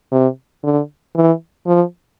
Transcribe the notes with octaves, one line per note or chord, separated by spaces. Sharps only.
C3
D3
E3
F3